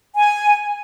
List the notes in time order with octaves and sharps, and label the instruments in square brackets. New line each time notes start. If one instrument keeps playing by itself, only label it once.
[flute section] G#5